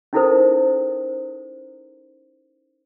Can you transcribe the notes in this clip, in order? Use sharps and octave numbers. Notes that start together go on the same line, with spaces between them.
C#4 D#4 E4 A4 A#4 C5